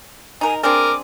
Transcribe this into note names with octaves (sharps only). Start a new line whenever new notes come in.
D#4 A#4 G#5
C4 D4 G#4 A#4 D6